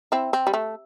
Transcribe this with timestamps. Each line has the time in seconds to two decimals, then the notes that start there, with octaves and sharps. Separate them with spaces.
0.12 C4 E4
0.33 C4
0.47 G3
0.54 A3